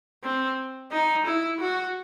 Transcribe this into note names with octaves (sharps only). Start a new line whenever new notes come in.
C4
D#4
E4
F#4